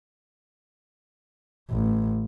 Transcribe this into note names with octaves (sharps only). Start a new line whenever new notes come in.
A1